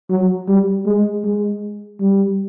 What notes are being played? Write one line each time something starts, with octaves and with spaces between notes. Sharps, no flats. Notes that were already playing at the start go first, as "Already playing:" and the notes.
F#3
G3
G#3
G#3
G3